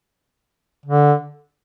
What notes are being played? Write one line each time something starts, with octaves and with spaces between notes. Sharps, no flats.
D3